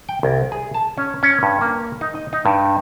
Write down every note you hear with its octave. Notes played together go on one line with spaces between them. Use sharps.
G5
C2
G#4
A5
C#4
C#4
G2
A#3
D#4
D#5
D#4
G2